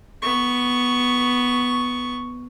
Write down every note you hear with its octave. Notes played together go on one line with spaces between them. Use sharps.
B3 C#6